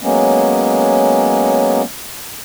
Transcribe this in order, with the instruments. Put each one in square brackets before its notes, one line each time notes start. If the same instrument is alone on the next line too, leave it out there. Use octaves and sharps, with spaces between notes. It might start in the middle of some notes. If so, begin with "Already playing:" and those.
[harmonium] F#3 G#3 A#3 B3 C#4